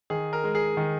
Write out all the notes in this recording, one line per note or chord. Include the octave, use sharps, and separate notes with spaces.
D#3 G#4
A#4
G#3
G#4
D#3